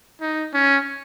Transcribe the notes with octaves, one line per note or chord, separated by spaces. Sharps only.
D#4
C#4